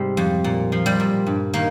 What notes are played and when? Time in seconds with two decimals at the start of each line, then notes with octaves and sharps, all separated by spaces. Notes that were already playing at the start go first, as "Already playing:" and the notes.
Already playing: G#2 C3 G3
0.17 F2
0.44 A#2
0.72 F3
0.86 G3
1.00 A#2
1.26 G2
1.54 D#3 A#3